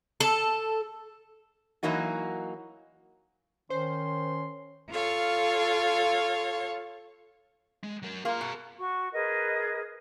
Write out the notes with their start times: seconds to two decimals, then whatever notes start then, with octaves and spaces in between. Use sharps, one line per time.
0.20 A4
1.83 E3 F#3 A#3 D#4 F#4
3.70 D#3 C#4 C5 C6
4.90 F4 A4 C#5 F5
7.84 G#3
8.02 F#3 A#4
8.25 A#3 F4 G#4 A#5
8.41 B2
8.79 F#4 C#6
9.13 G#4 A#4 B4 D#5